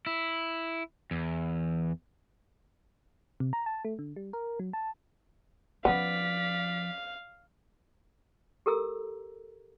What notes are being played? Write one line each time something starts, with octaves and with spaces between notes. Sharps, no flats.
E4
E2
C3
A#5
A5
A3
D3
G3
A#4
F#3
A5
F3 B3 C#4 D5 F5 B6
G4 A4 A#4 A#5 E6